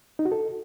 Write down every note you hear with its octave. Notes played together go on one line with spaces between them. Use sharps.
D#4
F#4
A4